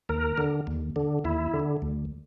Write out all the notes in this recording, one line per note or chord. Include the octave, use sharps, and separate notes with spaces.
D#2 A#4
D3
D#2
D3
D#2 E4
D3
D2